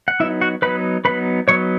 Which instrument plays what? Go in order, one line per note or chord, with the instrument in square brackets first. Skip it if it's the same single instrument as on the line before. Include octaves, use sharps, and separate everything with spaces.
[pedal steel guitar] F#5
F#3 B3 D#4 E4 E5
F#4 F#5
F#3 B3 D#4 B4 B5
F#3 B3 D#4 B4 B5
F#3 B3 D#4 C#5 C#6